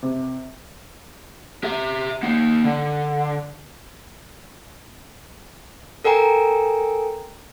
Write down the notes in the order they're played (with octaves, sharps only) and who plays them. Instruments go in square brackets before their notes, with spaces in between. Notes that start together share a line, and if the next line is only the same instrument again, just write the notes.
[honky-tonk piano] C3
[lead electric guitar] G4 E5
A#3 D#4
D3
[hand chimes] A4 A#4 G5 G#5 A#5